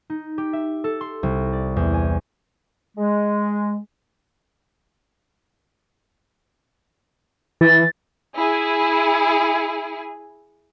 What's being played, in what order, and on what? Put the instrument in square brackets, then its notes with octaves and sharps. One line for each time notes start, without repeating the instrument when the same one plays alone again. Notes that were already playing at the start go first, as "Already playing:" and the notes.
[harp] D#4
G4
E5
A4
C6
C2
D5
E2
G#5
[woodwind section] G#3
[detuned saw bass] E3 [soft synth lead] A6
[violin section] E4 G#4